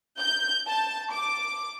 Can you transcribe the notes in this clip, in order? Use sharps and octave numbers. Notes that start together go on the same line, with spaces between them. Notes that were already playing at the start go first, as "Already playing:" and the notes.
G6
A5
D6